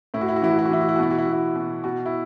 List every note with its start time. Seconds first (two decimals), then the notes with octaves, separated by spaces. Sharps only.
0.14 A2 E4
0.21 F#4
0.29 E4
0.36 F#4
0.42 E3 E4
0.51 F#4
0.59 E4
0.66 F#4
0.70 E3 E4
0.81 F#4
0.89 E4
0.96 F#4
0.99 B2 E4
1.11 F#4
1.18 E4
1.25 B2 F#4
1.33 E4
1.56 B2
1.84 B2 F#4
2.06 E4